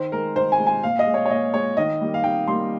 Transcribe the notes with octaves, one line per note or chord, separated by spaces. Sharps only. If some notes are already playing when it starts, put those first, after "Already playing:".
Already playing: D#3 C5
G#3 A#4
D#3 C5
G#5
G#3
G#5
A#2 F5
D#5
G#3
C#5
C#5
A#2 D#5
G#3 C#5
D#3 D#5
G3 A#3
F5
D#3 G5
G3 A#3 C6